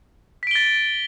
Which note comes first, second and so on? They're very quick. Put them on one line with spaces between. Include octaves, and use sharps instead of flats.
B6 D7 G7 A6